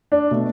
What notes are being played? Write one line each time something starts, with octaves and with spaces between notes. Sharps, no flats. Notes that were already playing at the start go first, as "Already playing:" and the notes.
D4
B2 A3